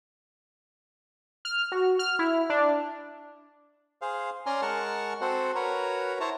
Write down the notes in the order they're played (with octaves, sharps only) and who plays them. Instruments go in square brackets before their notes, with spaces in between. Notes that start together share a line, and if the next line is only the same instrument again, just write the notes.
[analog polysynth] F6
F#4
F6
E4
D4
[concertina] G#4 C5 F5
C#4 D5 G#5 A#5 C6 F6
G#3 A#4 F#5 A5 C#6 F6
C4 F#4 A4 C5 F#5
F#4 A#4 B4 C#5 A#5
E4 C5 C#5 A5 A#5